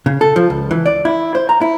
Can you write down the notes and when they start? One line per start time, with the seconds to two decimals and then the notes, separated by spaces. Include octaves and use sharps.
0.06 C#3
0.21 A4
0.36 F3
0.50 C#2
0.71 E3
0.86 D5
1.05 E4
1.35 C5
1.49 A#5
1.61 E4